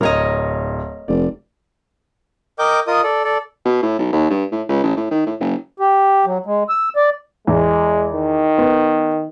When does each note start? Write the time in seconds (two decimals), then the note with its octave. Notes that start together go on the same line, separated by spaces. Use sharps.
0.01 D1 A#4 C#5 D#5
1.08 F1 D5
2.59 A#4 D#5 G5 D6 G6
2.87 F4 A#4 D#5 D#6
3.03 A4 D5
3.24 A4 D5
3.66 B2
3.83 A2
3.99 B1
4.13 D#2
4.30 G2
4.52 A2
4.69 C#2
4.84 A1
4.97 A2
5.11 D#3
5.26 A2
5.41 F#1
5.80 G4
6.26 F#3
6.46 G#3
6.69 E6
6.96 D5
7.47 E2 G#3
8.13 D#3
8.58 B3